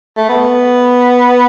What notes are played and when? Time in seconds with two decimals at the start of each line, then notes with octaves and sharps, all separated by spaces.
0.17 A3
0.29 B3